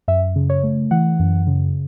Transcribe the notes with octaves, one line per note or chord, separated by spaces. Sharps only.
F#2 E5
C#3
C#5
A3
E3 F#5
F#2
C#3